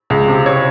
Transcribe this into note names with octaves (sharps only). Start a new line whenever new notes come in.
C#2
C3
C#5